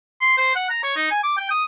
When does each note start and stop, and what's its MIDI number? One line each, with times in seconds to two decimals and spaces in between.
0.21 0.36 84
0.37 0.51 72
0.55 0.69 78
0.70 0.80 82
0.83 0.96 73
0.96 1.09 63
1.11 1.21 80
1.23 1.36 86
1.37 1.47 79
1.51 1.65 87